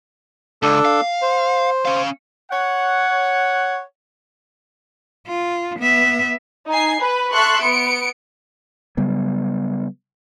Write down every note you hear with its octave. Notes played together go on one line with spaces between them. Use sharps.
C#2 D4 A4
F5
C5
C#4 F5
C#5 F#5
F4
B3 E5
D#4 G#5 C7
B4
A4 E5 C6 C#6 F#6
B3 C#7 D7
C#3 F#3 G3 B3